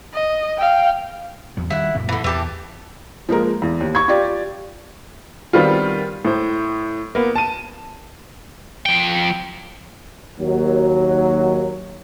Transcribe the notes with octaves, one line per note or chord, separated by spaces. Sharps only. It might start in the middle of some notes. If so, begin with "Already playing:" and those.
D#5
F5 G5
E2 F#3
D#3 G3 E4 F#5
F#2 A#2 A#3
D3 E3
E2 E3 G4 A5
F3 G#3 A#3 A#4
E2
D#2
C#6 G#6
F4 G4 D5
D#3 G3 B3 C4 F4
A2 C5
A#3 B3
A5 D#7
F3 G5
D#2 F#3